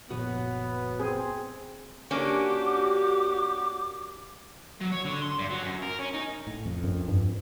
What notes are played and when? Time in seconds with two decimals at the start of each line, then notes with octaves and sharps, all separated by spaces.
0.11 F#1 A#2 F3 B3 F#4 B4 C#5
0.99 C4 G#4
2.11 A#3 C#4 D4 F#4 G4 D6
4.81 F#3
4.92 C#5
5.05 D3
5.22 C6
5.39 G2
5.51 F#3
5.63 F#2
5.82 A#4
5.99 C#4
6.13 D#4
6.47 A2
6.66 F2
6.84 F#2
7.08 G2